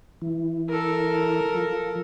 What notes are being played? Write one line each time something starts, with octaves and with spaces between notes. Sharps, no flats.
E3
A4 A#4
F3